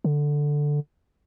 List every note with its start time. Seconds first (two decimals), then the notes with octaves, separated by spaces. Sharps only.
0.04 D3